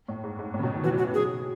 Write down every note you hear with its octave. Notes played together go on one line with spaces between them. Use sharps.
A2
G#2
G#2
A2
C#3
B2
D#3
E3 F#4
F#3 F#4
F#3 G#4